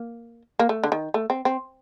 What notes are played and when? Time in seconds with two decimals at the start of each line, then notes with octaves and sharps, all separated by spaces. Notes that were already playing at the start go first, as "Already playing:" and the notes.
Already playing: A#3
0.59 A#3
0.69 A3
0.84 D3
0.92 D#3
1.14 A3
1.30 C4
1.45 C4